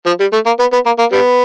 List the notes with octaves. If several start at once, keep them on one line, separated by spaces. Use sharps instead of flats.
F3
G3
A3
A#3
B3
B3
A#3
A#3
G3 B3